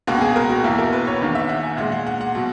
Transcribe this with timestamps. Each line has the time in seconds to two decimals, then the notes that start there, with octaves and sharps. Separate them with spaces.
0.07 C#2 B2 A#3 F#4
0.21 G#4
0.36 A#4
0.50 F#4
0.64 E2 B2 A#3 E4
0.78 A#4
0.89 A#4
0.93 B4
1.07 C#5
1.21 E2 D#3 A#3
1.35 E5
1.49 F#5
1.63 G#5
1.77 A#2 G#3 F#5
1.92 F#5
2.07 F#5
2.21 F#5
2.35 B2 F#3